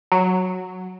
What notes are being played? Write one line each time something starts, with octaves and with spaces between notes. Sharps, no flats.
F#3